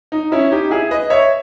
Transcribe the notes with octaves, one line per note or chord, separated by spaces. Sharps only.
D#4
C#4 E4
D#4 G4
E4 G#4
B4 D#5
C#5 E5